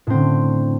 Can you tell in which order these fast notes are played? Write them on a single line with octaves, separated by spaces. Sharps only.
A2 C4 D3